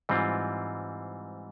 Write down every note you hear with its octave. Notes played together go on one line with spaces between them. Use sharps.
G#2 E3 G3 C4 F4